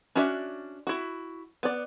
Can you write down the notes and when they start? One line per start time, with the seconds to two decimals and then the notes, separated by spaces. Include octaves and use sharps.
0.15 C#4 D4 F#4 D5 E5
0.87 E4 F#4
1.63 B3 D5